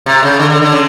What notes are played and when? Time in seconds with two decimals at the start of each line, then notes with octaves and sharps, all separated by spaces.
0.06 C3
0.23 C#3
0.39 D3
0.50 D3
0.62 D3
0.72 C#3